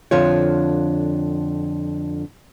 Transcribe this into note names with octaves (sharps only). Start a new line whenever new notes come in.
F2 D3 D4 F4 C5 C#5